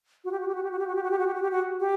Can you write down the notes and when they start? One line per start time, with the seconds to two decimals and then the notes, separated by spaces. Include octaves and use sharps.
0.25 F#4
0.32 G4
0.40 F#4
0.48 G4
0.55 F#4
0.63 G4
0.71 F#4
0.79 G4
0.87 F#4
0.95 G4
1.04 F#4
1.11 G4
1.19 F#4
1.27 G4
1.34 F#4
1.42 G4
1.51 F#4
1.80 G4